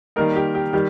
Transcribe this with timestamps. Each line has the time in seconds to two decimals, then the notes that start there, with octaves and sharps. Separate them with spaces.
0.16 D#3 G3 A#3 D#4 A#4
0.36 G4
0.55 G4
0.73 D#3 G3 G4